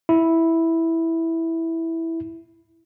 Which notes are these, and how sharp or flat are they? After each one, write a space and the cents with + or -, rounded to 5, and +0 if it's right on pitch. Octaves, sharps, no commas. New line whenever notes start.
E4 -5